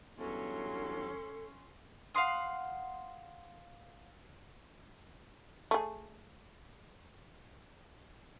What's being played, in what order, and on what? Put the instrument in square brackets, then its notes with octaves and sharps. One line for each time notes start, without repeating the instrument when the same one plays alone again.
[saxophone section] E2 G2 F#3 [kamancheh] C#4 C6 [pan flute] A4
[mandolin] F5 F#5 C6 D#6
[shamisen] A3 G#4